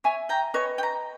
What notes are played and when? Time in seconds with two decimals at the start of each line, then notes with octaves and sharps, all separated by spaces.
0.04 C#5 E5 G#5
0.29 G5 A#5
0.54 B4 C#5 D#5
0.78 G5
0.83 A#5